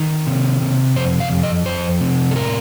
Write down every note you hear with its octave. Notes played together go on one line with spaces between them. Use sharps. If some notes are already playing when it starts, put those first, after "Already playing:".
Already playing: D#3
C3
C3
F2 C5
F5
F2
D#5
F2 C5
C3
A4
A2 A#4